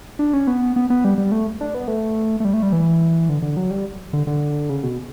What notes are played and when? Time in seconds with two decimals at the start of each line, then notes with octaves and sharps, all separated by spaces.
0.19 D4
0.33 C#4
0.47 B3
0.76 B3
0.90 B3
1.05 G3
1.18 G3
1.32 A3
1.61 D4
1.74 B3
1.88 A3
2.40 A3
2.45 G3
2.54 A3
2.63 G3
2.72 E3
3.29 D3
3.42 D3
3.57 F#3
3.71 G3
4.13 D3
4.27 D3
4.69 C#3
4.83 B2